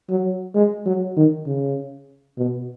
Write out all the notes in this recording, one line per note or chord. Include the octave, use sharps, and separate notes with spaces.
F#3
G#3
F#3
D#3
C#3
B2